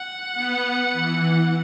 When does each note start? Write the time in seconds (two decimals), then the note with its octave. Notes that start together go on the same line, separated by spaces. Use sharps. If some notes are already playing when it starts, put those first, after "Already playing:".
Already playing: F#5
0.33 B3
0.92 E3